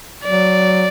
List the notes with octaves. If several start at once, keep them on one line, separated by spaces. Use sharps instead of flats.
F#3 D5